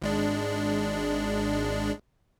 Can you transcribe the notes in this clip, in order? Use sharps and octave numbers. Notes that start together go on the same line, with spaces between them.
G#1 G#3 D4